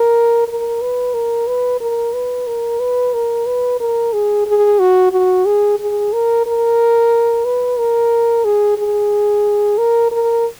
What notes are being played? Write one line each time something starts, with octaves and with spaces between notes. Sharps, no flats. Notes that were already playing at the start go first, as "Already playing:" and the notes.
Already playing: A#4
A#4
B4
A#4
B4
A#4
B4
A#4
B4
A#4
B4
A#4
G#4
G#4
F#4
F#4
G#4
G#4
A#4
A#4
B4
A#4
G#4
G#4
A#4
A#4